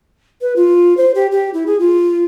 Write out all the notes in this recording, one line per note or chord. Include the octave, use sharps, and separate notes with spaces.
B4
F4
C5
G4
G4
E4
G#4
F4